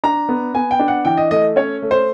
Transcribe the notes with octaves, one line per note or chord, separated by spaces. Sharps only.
D4 A#5
B3
B3 G#5
G5
D4
F#5
E3 G5
D#5
A3 D#5
C#4 C#5
A3
C5